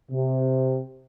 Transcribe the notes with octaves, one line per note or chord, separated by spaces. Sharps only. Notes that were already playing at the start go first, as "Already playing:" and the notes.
C3